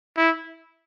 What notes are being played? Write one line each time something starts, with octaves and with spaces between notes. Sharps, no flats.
E4